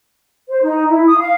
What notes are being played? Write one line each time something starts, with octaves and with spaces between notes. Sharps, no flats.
C5
D#4
E4
D#6
F5